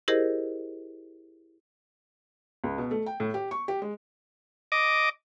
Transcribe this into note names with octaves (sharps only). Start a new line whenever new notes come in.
E4 G4 G#4 A#4 C5 D#5
C#2
B2
A3
G5
A2
G4
C#6
G4
G#3
D#5 D6